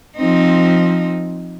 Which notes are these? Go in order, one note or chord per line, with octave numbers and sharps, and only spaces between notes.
F3 C4 D#4